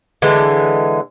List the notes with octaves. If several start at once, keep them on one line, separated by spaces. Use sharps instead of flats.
D3 E3 G#3